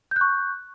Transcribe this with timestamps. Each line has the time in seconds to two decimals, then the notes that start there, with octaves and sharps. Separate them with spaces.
0.11 G6
0.16 F#6
0.21 C#6